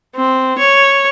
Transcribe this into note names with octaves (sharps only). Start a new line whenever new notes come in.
C4
C#5